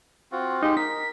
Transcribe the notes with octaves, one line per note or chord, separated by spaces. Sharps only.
C4 F4 F#4
G#3 D#4 G4
A#4 B6